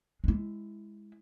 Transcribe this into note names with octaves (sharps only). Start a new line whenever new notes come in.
G#3 E4